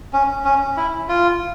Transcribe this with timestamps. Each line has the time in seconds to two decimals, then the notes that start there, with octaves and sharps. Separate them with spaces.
0.13 C#4
0.44 C#4
0.77 E4
1.08 F4